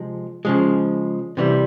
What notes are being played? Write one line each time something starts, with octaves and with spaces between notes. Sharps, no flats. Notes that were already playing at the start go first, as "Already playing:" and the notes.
Already playing: C3 F3 G#3
C#3 F3 G#3
C3 E3 G3